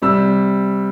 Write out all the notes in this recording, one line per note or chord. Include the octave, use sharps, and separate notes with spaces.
C3 G3 E6